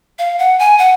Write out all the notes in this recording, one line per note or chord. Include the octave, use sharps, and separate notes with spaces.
F5
F#5
G#5
F#5